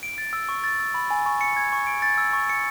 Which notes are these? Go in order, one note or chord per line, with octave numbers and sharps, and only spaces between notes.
D7
A6
E6
C#6
A6
E6
B5
G#5
C#6
C#7
G#6
C#6
D7
A6
E6
C#6
C#7